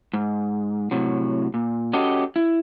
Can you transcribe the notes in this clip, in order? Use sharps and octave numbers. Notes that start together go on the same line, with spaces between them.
G#2
A2 C3 F#3
A#2
C#4 F#4 G4 A4 D#5
E4